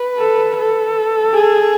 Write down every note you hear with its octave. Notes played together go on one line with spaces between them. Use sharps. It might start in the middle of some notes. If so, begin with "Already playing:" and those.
Already playing: B4
A4
A4
G#4